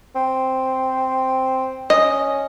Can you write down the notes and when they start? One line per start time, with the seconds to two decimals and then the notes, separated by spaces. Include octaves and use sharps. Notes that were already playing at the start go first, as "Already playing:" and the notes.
0.15 C4
1.90 C#4 D#5